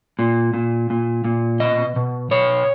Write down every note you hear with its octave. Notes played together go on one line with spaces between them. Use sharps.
A#2
A#2
A#2
A#2
B2 D#5
B2
B2 C#5